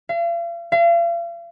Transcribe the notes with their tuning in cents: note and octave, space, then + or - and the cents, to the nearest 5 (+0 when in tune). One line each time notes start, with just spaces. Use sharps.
F5 -40
F5 -40